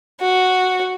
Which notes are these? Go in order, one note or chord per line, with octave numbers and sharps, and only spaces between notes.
F#4